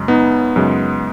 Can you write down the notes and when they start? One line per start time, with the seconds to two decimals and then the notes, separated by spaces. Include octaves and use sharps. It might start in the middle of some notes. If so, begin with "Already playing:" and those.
Already playing: F#2 C#3 G#3
0.08 B3 D#4
0.56 F#2 C#3 G#3